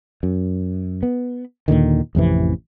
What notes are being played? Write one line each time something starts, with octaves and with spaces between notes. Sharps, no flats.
F#2
B3
D#2 A#2 D3 D#3
A1 F2 C3 E3